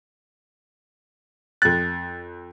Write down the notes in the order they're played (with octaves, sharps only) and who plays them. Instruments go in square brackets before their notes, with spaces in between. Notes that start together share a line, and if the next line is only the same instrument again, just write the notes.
[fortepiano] F2 F#6 [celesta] A6